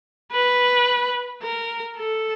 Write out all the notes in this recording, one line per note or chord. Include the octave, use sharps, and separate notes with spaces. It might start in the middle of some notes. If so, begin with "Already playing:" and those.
B4
A#4
A4